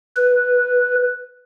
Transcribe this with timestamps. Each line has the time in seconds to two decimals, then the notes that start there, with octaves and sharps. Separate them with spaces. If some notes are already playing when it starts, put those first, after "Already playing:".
0.17 B4